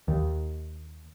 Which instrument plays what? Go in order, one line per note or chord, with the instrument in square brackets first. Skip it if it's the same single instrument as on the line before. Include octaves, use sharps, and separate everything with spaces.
[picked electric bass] D#2